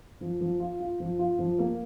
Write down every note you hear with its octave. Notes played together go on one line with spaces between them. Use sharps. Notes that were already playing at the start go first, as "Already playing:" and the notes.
F3
F3
F4
F4
F3
F4
F3
A#3